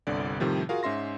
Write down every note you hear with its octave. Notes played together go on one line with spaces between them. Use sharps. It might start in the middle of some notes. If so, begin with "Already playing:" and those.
G1 C2 D3 D5
A2 C3 D#3 F3 G3
F4 F#4 G#4 A#4 F5
G#2 C#4 E5 C6 A#6